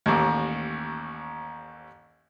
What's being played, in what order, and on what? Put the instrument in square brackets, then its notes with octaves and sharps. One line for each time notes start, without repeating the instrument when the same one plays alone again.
[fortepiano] A1 D#2